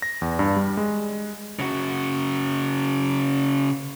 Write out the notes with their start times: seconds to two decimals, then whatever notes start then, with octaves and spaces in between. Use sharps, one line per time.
0.02 A#6
0.22 E2
0.39 G2
0.56 G3
0.77 G#3
1.59 C#3 F#4